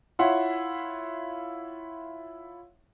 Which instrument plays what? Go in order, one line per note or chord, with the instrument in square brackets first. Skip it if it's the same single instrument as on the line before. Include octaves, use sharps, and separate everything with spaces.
[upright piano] E4 F4 C#5 E5 F#5 C6